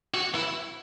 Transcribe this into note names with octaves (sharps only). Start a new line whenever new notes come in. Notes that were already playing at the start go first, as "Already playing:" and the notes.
F#4
E4